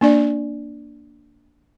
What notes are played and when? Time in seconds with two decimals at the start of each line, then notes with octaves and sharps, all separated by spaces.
0.01 A#3 D4 D5